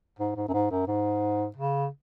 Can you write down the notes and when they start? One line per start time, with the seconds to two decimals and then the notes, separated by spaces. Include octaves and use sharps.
0.19 G#2
0.36 G#2
0.48 F#2
0.54 G#2
0.71 F#2
0.87 G#2
1.56 C#3